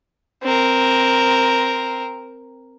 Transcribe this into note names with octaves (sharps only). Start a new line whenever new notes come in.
C4 A#4